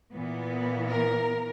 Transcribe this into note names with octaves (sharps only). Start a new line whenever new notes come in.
A#2 E3 B3
A#4